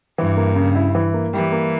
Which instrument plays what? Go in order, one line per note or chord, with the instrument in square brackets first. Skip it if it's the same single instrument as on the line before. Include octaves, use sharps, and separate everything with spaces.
[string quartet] G2 [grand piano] E3
[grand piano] A#3
C#3
E4
E3
A#3
[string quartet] E3 [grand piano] G3
[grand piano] A#3